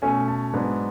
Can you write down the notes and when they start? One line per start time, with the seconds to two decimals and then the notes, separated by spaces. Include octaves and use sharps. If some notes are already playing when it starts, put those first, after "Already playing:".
0.02 B2 A3 C#4 G#5
0.28 A5
0.53 G#2 F#3 B3 D4